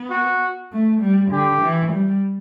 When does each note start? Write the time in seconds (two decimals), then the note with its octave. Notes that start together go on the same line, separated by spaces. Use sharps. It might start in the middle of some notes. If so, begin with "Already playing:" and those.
Already playing: B3
0.10 F#4
0.72 A3
1.01 G3
1.31 D3 G4
1.62 E3
1.92 G3